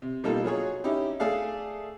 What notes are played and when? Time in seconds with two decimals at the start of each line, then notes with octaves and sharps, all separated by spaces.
0.02 C3
0.24 B2 G3 A#3 D#4 F4 A4
0.44 F#3 F4 G#4 C#5
0.84 C#4 D#4 E4 G4
1.20 A3 G#4 A4 D5 F5